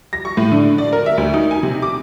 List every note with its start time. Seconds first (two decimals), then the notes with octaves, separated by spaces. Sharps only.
0.13 A#6
0.25 C#6
0.37 A2
0.52 D3
0.78 D5
0.93 A#4
1.06 E5
1.18 D2
1.34 D#4
1.51 G#5
1.63 C3
1.82 D6